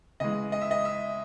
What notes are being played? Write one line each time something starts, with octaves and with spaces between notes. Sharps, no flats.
C#3 E3 G#3 D#5
D#5
E5
D#5
E5